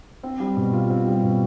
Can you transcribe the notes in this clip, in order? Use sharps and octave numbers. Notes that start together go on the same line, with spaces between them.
C4
G3
B2
F4
C4
G3
B2